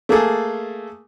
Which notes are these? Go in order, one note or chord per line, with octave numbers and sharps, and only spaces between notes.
A3 A#3 G#4 A4